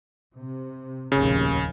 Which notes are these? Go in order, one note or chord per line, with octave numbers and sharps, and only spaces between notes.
C3
F1 A#1 D#2 C#3